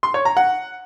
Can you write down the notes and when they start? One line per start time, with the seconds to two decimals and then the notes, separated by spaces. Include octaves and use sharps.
0.03 C6
0.14 C#5
0.25 A#5
0.37 F#5